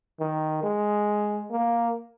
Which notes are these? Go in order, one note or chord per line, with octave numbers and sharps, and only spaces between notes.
D#3
G#3
A#3